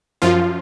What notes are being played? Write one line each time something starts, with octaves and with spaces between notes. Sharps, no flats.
F#2 F3 F4